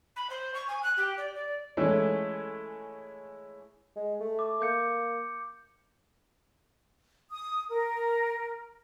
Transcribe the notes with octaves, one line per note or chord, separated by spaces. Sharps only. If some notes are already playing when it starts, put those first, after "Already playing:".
B5
C5
C#6
G#5
F#6
G4
D5
D5
E3 G#3 A3 C#4 E4
G#3
A3
D6
A#3 D6 G6 C#7
D#6
A#4